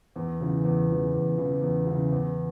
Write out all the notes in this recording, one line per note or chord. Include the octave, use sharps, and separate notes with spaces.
E2
C#3 E3
E2
C#3 E3
E2
C#3 E3
E2
C#3 E3
E2